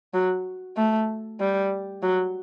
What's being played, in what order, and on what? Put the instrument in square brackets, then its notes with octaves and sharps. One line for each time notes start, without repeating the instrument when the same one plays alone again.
[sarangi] F#3
A3
G3
F#3